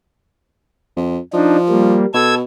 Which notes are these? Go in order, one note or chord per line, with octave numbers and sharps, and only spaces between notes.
F2
F3 D4 D#4
G3 A#3
B2 A4 E6 G#6